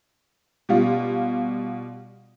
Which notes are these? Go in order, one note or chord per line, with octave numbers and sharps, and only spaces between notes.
B2 G3 F4